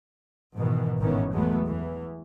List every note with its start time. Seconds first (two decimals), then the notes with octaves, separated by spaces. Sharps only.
0.57 G#2 B2 D#3 E3
0.99 G#1 A2 D#3 E3 B3 C#4
1.34 E2 F#3 G#3 A3 B3
1.66 E2 E3